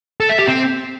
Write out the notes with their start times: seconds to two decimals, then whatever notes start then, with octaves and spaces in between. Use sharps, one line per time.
0.20 A4
0.29 E5
0.39 G4
0.48 C4